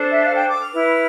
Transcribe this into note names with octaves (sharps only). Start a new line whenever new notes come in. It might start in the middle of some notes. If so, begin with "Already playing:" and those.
Already playing: D4 A4 C5
E5
F5
G5
D6
E6
F6
E4 B4